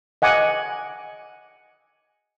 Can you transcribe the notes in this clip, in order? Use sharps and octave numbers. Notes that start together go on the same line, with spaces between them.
D#5 F#5 G#5 D6